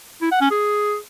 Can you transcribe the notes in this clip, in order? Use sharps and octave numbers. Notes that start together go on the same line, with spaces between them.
E4
F#5
C#4
G#4